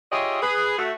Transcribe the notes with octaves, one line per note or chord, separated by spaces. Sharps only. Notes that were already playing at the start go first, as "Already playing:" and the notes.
F4 G4 G#4 C#5 D#5 E5
G#4 B4
A3 F#4